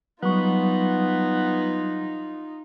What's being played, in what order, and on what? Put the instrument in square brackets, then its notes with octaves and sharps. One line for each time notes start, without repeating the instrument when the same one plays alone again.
[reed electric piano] F#3 G3 C#6 [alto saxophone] B3 [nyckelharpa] D#4 F4